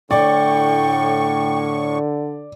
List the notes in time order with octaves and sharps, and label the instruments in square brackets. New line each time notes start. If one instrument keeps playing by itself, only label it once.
[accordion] A2 C#6 [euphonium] D3 [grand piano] D5 [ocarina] G5